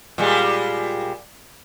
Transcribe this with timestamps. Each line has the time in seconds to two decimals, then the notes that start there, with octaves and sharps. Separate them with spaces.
0.18 A#2 G3 G#3